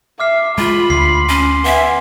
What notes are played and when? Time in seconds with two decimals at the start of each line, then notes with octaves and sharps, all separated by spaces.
0.20 E5 D6 F6 C7
0.58 G#3 F4 B5
0.90 D2 C6 C7
1.29 C#4
1.64 B3 E5 G#5 G7